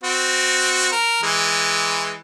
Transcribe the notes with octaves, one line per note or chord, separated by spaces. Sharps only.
C4 F#4
A#4
E3 G#3